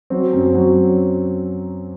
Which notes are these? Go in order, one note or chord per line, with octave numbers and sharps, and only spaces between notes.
F#3 C4
F#2
F#3